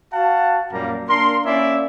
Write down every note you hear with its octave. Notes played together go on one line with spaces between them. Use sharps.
F#4 F5 F#5 A5
F#2 A#2 G3 A#3 A#5
A#3 D4 A#4 C6
A#3 C#4 E4 D5 E5